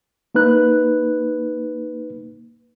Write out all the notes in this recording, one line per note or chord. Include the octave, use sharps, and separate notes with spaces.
A#3 D#4 B4 F#6